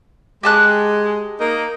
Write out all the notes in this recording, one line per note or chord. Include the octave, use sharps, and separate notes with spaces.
G#3 G4 A5 F#6
A#3 D#4